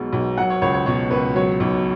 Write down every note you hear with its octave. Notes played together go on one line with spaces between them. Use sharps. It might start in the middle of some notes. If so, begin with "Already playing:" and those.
Already playing: B1 B2 G#3
B1
F#3 F#5
C#5
C#2 C#5
C#5
B2 C#5
C#2 B4
F#3 C#5
B1